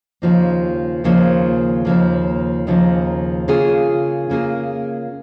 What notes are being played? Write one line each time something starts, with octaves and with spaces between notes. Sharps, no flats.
D#2 C#3 F3 A#3
D#2 C#3 F3 A#3
D#2 C#3 F3 A#3
D#2 C#3 F3 A#3
C#3 A#3 F4 G#4
C#3 A#3 F4 G#4